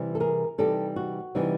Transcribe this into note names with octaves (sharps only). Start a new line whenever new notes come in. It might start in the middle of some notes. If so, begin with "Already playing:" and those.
Already playing: C3 E3 G3 C4
A4
G#4 A#4
C3 E3 G3 C4 D#4 G4 A4
F#4
C3 E3 G3 C4 D#4